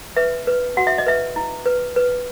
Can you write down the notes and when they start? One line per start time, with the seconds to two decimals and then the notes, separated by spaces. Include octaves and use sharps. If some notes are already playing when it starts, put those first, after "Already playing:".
0.17 B4 E5
0.47 B4
0.77 F#4 F#5
0.87 E5
0.98 D#5
1.06 B4 E5
1.36 E4
1.66 B4
1.96 B4